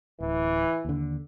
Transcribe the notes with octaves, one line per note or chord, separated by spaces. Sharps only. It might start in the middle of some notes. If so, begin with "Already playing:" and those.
D1 E3
D#2 D3